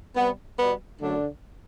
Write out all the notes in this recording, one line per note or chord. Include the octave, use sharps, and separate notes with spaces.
C3 G3 B3
B2 G3 B3
F#2 D3 F#3 A3 D4